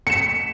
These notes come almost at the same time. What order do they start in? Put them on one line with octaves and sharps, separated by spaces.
C#7 E7 B6